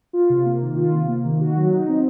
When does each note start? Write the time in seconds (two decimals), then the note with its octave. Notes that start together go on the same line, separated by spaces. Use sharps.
0.13 F4
0.30 C3
0.45 A#3
0.62 D#3
0.76 F4
0.93 C3
1.08 A#3
1.25 D#3
1.41 F#4
1.57 F#3
1.72 D#4
1.88 C4